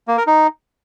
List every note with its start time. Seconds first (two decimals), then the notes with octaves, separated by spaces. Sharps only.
0.08 A#3
0.17 A#4
0.27 D#4